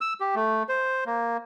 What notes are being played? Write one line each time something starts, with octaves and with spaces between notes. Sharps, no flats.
E6
G4
A3
C5
A#3